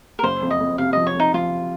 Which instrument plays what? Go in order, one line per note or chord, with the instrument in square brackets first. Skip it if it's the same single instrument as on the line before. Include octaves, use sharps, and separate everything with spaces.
[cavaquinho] A#4
[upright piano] F#1 [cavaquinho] C5
[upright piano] F2
[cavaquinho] D#5
[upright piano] F2
[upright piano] C3 [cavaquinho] F5
[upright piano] F3 [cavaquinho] D#5
[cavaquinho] C#5
[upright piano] F2 [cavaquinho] D#4
[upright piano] F3 [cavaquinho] F4